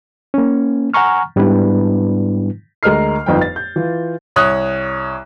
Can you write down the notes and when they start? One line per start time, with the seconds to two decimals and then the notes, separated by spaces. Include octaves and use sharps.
0.34 A#3 C#4
0.94 F#5 G#5 A#5 C#6 F6
1.36 G#2 G3 B3 D4 E4 B4
2.83 D2 G#3 A#4 D#5 F6 C7
3.26 G1 F2 D#4 B4 G5
3.41 A6
3.56 G6
3.76 E3 F4
4.36 C2 C#5 D#6 F#6